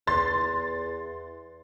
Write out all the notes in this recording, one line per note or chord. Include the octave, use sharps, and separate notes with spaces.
E2 C6 A6